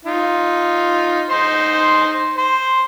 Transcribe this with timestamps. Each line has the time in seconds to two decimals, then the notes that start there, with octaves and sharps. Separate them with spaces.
0.05 D#4 F4
1.30 D#4 C5 C6
2.38 C5